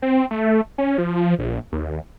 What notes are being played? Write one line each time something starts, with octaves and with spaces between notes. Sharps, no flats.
C4
A3
C#4
F3
A#1
D#2